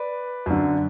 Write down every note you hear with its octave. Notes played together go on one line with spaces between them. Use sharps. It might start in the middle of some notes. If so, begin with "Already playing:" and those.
Already playing: B4 D5
F#2 D3